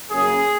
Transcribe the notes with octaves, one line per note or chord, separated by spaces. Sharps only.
F#2 C#3 F#3 A#3 G#4